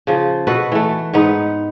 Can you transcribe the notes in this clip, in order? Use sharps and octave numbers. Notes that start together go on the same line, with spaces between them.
C#3 F3
B2 F#4 A4 B4
E3 A3
G#2 B3 D#4